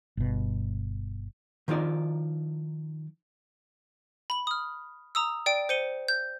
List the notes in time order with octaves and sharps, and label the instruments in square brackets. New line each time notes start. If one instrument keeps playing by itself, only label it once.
[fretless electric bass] G1 B2
[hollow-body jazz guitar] D#3 F3 D#4 F4 D5
[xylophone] B5 F#7
D#6 F6
A#5 D#6 E6
D5 G5 D7
C5 C#7 D#7 G7
G6